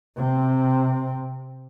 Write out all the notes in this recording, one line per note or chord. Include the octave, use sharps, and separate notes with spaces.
C3 C4